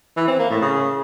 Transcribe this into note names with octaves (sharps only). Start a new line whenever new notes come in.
E3
C4
A#3
A2
C#3